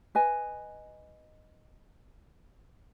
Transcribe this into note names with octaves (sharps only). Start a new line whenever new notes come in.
B4 D#5 G#5